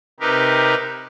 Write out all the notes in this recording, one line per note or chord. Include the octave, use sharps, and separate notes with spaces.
C3 D#4 G4 A#4 B4